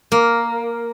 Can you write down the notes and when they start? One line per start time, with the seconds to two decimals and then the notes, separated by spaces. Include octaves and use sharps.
0.12 A#3